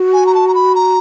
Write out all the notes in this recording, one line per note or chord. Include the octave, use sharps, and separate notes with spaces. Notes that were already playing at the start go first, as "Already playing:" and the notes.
Already playing: F#4
G#5
A#5
A5
A#5
B5
A#5